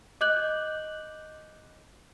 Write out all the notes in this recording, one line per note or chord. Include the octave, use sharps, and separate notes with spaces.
D#5 D6 F#6 G6 F#7